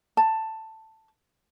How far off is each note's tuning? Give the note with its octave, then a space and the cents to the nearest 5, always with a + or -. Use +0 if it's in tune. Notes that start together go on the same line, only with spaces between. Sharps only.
A5 +10